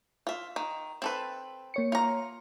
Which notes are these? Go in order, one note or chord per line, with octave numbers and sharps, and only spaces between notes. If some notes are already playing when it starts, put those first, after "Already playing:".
F4 E5
D#3
C4 A4 B4
A#3 C#5 C#7
F4 A#5